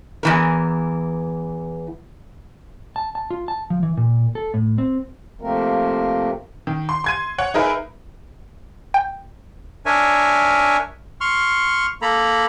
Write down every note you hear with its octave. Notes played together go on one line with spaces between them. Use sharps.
E2 E3 A#4
A5
A5
F4
A5
F3
E3
A#2
A4
A2
C4
C3 F3 A3 A#3 C4 A#4
D#3
C6
C6 G#6 D#7
C#5 F#5
D#4 G#4 A#4 B4 E5
G5
D4 A#4 C#5 E5 G#5
C6 C#6 F6
A#3 A4 A#5 B5